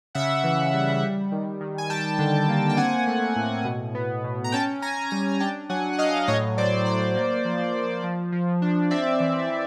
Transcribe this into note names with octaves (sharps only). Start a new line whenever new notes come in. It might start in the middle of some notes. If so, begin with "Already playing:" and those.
C#3 E5 F#5
E3
G3
G3
D#3
D#3
G#5
G3 G5 A5
D3
A#3
G5
C4 F#5 G#5
A3
A2
B2
B3
B2
A#5
C#4 G5 A5
C#4 G#5 A#5
G3 G#5 A#5
D4 G5 A5
F#3 F#5 G#5
F#5
F#3 D#5 F5
A2 C#5 D#5
F#3 C5 D5
A2 C5 D5
A#3
F3
F3
F3
F3
D4
C4 D5 E5
E3
E3